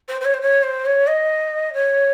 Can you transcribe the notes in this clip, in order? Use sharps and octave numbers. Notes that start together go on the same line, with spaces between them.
C5
C5
C#5
C5
C#5
C5
C#5
D#5
C#5